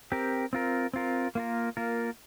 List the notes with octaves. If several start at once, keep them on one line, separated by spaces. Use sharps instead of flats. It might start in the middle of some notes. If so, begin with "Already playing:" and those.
C4 G4 A#4
C4 F4 A#4
C4 F4 A#4
A#3 F4 A#4
A#3 F4 A#4